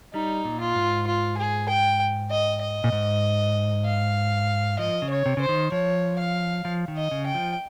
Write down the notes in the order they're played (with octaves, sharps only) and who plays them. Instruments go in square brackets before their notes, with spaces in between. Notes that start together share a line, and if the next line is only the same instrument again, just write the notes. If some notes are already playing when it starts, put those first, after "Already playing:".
[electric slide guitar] G3 [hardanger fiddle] D#4
[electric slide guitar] A#2
[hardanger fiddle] F4
[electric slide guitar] G#2
[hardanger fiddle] F4
G#4
G5
D#5
D#5
[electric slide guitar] A#2
G#2
[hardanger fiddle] F5
[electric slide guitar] F3 [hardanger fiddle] D#5
[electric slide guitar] C#3
[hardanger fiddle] C#5
[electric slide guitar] C3
[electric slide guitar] C#3 [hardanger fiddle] C5
[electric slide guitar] D#3
[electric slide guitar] F3 [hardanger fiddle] C#5
[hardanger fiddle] F5
[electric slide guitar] F3
D#3
[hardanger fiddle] D#5
[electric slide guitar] C#3
[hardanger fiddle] G5
[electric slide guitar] F3